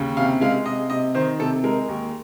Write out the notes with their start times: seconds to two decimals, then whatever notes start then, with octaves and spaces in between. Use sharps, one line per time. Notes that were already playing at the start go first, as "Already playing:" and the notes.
Already playing: D#2 C#3
0.17 C3 F5
0.41 G#3 F5
0.66 C3 D#5
0.90 C3 D#5
1.15 D#3 C5
1.39 C3 A4
1.64 G#3 A#4
1.89 D#2